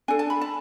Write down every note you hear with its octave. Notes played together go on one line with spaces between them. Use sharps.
D4 A4 G#5
A5
B5
A5